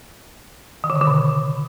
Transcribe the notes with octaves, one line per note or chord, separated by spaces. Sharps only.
D#3
D3
C#3
D3
B2